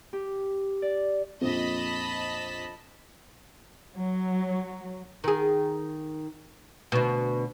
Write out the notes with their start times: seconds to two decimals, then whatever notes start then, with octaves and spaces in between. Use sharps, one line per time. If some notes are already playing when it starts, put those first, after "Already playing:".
0.13 G4
0.82 D5
1.41 A#1 F2 D#5 A5 B5
3.96 F#3
5.24 D#3 G#4
6.92 D2 B2